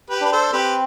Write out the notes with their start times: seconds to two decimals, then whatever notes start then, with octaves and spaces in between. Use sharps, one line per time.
0.10 G4 B4
0.21 D4 B4
0.32 A4 C5
0.53 C4 G4 B4